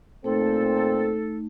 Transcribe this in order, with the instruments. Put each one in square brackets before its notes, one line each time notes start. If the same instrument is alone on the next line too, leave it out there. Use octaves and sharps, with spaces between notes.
[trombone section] A#2 C4 [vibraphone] A3 D#4 [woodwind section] A4